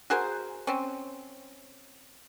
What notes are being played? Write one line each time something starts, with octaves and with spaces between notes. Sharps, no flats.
F#4 G#4 A#4 C5
C4 C#4